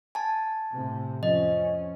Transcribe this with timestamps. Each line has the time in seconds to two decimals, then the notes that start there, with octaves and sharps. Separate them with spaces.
0.15 G#5 A5
0.73 A2 C3
1.23 F2 F3 C#4 D#5